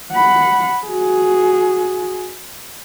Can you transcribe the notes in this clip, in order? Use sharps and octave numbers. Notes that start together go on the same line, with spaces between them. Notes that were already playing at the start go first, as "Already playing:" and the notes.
F#5 B5
F#4 G#4